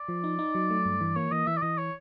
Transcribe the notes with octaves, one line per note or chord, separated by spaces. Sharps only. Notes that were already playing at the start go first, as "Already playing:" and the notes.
Already playing: D5
F3
D#4
D#4
F#3
A3
G2
E3
A#3 C#5
E3 D#5
E3 E5
D5
E3 D#5
C#5